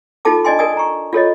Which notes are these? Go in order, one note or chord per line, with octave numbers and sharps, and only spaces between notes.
D#4 F4 A4 A5 D6
D4 D5 D#5 G#5 C6
A#4 D5 G#5 D#6
A#5 C#6
F4 A4 C#5 D#5